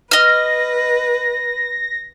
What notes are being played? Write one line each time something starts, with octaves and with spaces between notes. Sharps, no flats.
B4 D#5 F6 A#6